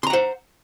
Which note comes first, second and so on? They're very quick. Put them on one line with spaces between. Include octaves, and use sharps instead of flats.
C6 A#5 F#5 C5